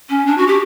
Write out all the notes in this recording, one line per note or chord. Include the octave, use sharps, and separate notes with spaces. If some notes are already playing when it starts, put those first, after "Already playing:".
C#4
D4
F#4
G4